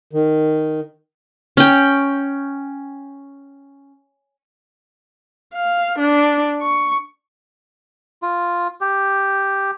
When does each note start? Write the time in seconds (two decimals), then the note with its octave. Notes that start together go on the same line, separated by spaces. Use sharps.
0.13 D#3
1.57 C#4 G5
5.55 F5
5.99 D4
6.62 C#6
8.22 F4
8.81 G4